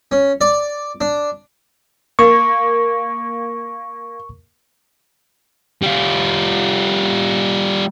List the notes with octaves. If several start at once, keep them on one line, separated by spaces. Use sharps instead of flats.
C#4
D5
D4
A#3 C#6
G3 F4